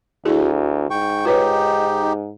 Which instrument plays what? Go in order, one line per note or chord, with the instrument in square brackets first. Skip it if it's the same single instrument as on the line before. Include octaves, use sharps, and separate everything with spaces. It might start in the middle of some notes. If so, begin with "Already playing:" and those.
[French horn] D2 [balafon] E4 F#4 G#4
[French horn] G#2 [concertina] G5 C#6
[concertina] D#4 G4 [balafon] F4 B4 C#5